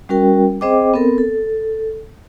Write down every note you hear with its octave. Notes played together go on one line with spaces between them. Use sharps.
G3 C#4 F#4 A#4 G5
C4 G#4 C5 D#5 G5 D6
B3 C4 A4 A#4
A4